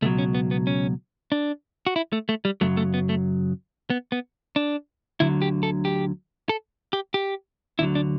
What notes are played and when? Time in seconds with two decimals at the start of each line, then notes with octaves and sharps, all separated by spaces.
0.02 C#2 B2 F#3 A3
0.18 C#4
0.35 B3
0.51 B3
0.67 C#4
1.32 D4
1.87 F#4
1.96 E4
2.13 A3
2.29 A3
2.45 G3
2.61 F#2 C#3 F#3 A3
2.77 A3
2.94 B3
3.09 A3
3.90 B3
4.12 B3
4.56 D4
5.20 D2 D3 F#3 E4
5.42 G4
5.63 A4
5.85 G4
6.49 A4
6.93 G4
7.14 G4
7.79 D2 D3 F#3 E4
7.95 D4